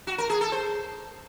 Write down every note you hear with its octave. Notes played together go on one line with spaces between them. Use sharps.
F#4
A#4
G#4
A4
C5